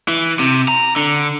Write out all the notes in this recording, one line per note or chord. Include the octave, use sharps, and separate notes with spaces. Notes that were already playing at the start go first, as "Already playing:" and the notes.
E3
C3
A#5
D3